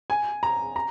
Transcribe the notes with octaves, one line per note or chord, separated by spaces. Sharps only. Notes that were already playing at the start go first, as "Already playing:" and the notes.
G#5
A#5
A#5